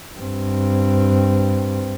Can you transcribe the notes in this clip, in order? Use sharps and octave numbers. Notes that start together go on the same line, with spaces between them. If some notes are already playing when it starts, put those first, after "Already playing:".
G2 C4